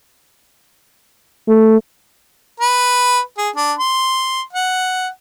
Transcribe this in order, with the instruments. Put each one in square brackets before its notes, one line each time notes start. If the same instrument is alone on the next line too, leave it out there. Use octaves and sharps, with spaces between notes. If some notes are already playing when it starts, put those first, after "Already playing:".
[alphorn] A3
[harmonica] B4
G#4
D4
C6
F#5